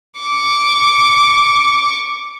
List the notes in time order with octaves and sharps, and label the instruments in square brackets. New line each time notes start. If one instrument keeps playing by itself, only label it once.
[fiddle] C#6 D6